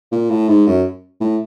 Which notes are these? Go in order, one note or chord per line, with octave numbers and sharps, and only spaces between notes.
A#2
A2
G#2
F#2
A2